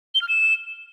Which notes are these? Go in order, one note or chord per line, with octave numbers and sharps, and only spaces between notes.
G7
F6
E7